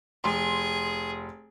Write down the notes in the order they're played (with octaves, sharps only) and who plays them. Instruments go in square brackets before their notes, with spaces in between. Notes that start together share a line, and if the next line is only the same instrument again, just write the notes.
[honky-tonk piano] F1 C6 [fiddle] G#4